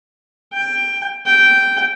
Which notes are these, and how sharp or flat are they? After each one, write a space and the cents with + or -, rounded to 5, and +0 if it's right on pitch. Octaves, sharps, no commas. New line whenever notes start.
G5 +15
G5 -10